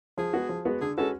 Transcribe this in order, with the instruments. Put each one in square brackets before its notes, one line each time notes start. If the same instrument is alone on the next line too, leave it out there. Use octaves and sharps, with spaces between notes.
[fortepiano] F3 [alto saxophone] G#4
[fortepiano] G#3 B3 F#4
F3
G#3 B3 F#4
[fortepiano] D3 [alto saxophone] G#4
[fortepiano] G#3 C#4 F#4 B4 [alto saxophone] A4